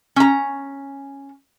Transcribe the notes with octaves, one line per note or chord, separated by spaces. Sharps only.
C#4 A#5